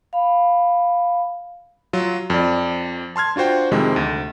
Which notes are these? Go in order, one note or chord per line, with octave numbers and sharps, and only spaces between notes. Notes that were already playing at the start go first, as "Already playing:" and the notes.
F5 B5
F#3 F4
F2 D5
A5 C6 F6 G#6
D4 F4 F#4 C5 G5
F2 C3 D#3 G#3
D2